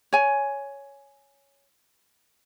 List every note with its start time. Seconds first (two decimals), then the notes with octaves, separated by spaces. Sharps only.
0.13 C#5 G#5